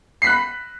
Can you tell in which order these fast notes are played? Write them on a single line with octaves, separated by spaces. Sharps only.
C7 B6 F#6 B5